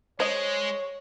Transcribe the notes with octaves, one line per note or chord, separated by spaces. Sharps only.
G#3 C5 C#5 D#5